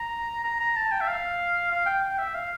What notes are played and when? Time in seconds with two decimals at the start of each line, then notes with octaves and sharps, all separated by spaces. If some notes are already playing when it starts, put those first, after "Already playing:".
Already playing: A#5
0.44 A#5
0.60 A#5
0.76 A5
0.91 G5
1.01 E5
1.07 F5
1.71 F5
1.86 G5
2.02 G5
2.18 E5
2.34 F5